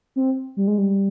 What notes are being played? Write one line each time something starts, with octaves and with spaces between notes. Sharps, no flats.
C4
G3
G#3
G3